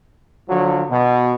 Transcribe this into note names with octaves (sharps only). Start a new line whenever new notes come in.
D3 F3 F#3
B2